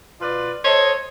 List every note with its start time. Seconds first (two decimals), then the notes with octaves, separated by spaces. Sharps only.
0.21 B2 F4 B4 D5
0.65 A4 C5 C#5 D#5